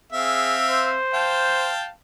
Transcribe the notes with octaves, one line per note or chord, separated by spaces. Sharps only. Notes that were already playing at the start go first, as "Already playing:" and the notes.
C4 G#4 E5 F5
C5
F5 G5 A5